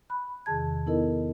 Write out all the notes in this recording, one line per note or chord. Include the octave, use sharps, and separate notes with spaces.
B5 F#6
E2 C3 D#3 G#4 A5 G#6
B3 D#4 E4 A4 A#4 D#5